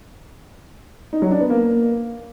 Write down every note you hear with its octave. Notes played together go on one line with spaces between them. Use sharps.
D#4
F#3
D4
B3
A#3